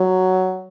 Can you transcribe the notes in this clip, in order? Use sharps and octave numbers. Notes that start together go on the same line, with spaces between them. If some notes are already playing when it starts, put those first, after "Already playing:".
Already playing: F#3